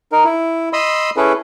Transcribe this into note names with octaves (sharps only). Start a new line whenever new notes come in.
D#4 A#4
E4
D#5 B5 C6 D#6 E6
C#4 E4 G#4 A4 B4